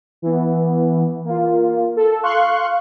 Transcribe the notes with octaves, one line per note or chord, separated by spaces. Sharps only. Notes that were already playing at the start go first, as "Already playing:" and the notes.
E3 B3
A#3 F4
A4
F5 C6 C#6 F#6